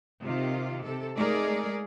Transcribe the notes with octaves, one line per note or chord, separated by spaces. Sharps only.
C3 D#3 F4
C3 A4
G#3 A3 D#4 G#4 A#4 D5